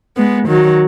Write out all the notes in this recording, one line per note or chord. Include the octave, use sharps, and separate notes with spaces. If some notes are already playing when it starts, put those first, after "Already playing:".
G#3 B3
D#3 F#3